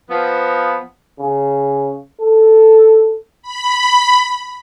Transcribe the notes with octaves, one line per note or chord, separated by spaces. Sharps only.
F3 B3
C#3
A4
B5